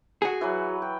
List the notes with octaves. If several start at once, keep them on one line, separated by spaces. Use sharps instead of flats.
F#4 G#4
E3 F#3 B4
G5